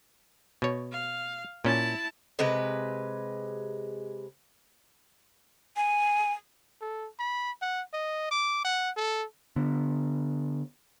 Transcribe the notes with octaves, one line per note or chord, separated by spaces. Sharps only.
B2 C#5
F5
A#2 C#4 E4 A5
C3 G#3 B4
G#5
A4
B5
F#5
D#5
D6
F#5
A4
D3 B3